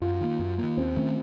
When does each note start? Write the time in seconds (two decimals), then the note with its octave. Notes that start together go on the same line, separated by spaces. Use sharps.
0.01 F#2 F4
0.21 D#3 A#3
0.39 F#2
0.58 D#3 A#3
0.77 D#2 C4
0.96 D#3 A3 C#4